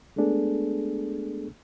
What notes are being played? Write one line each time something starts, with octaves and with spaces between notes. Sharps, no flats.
G#3 A3 B3 D4 G#4 A4